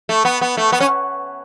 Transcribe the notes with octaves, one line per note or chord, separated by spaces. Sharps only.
A3
B3
B3
A3
B3
C#4